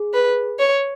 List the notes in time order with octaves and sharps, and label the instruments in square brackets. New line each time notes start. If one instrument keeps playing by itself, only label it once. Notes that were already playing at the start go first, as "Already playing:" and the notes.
Already playing: [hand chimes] G#4
[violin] B4
C#5